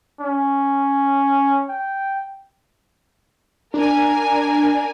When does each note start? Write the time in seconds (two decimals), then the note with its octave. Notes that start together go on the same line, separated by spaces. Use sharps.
0.21 C#4
1.69 G5
3.74 D4 A#4 G#5